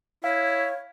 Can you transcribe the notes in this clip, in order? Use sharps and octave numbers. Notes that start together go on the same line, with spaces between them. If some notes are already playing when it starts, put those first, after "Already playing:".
E4 C#5 F5